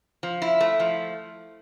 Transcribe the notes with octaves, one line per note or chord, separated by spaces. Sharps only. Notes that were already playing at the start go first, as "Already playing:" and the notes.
F3
E4
A3
F3